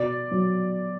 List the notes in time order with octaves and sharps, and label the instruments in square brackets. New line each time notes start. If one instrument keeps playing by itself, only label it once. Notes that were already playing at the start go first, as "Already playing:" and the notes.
Already playing: [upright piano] B2 D5
F#3